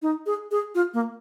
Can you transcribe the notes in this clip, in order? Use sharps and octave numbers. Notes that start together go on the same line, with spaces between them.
D#4
G#4
G#4
F4
A#3